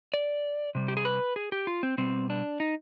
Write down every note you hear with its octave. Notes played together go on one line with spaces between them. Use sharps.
D5
C3 G3
G4
G#4
B4
G#4
G4
F4
C4
B2 G3 C4
D4
D#4